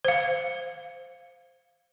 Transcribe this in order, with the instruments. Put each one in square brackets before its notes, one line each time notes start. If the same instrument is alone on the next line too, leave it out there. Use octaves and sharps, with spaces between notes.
[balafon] C5 F5